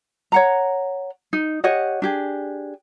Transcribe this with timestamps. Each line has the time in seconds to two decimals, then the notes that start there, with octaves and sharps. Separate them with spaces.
0.32 C#5 F#5 A#5
1.33 D#4
1.64 G4 C#5 D#5 F#5
2.02 D4 G4 G#4